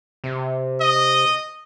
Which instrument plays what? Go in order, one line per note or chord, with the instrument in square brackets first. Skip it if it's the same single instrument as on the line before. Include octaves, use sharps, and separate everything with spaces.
[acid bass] C3
[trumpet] D#5